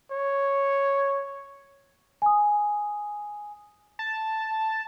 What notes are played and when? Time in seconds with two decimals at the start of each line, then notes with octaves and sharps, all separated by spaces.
0.11 C#5
2.22 G#5 D#6
3.99 A5